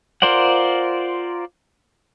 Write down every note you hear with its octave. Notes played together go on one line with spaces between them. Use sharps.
F4 A#4 C5 D5 F#5